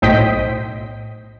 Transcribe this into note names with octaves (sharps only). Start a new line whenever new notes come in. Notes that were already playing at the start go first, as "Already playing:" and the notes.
B1 A2 C5 D#5 G5 B6